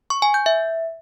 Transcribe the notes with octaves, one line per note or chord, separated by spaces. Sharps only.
C#6
G#5
G6
E5